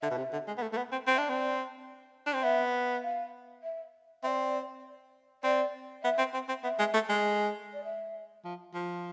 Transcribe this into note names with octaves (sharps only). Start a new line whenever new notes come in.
D3 E5
B2
C3
D3
G#3
B3
A3
A3
B3
C4
C4
E5
D4 D5
C4
D4
C4
B3 E5
F5
E5
C4 D5 E5
C4 D5
B3 E5
C4
C4
C4
B3 E5
G#3
A3
G#3
D5
E5
F3
F3